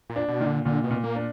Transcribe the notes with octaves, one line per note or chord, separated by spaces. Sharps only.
A#2
D4
B2
A#2 D#3
D3
A#2 D3
B2
A#2
A#3
D4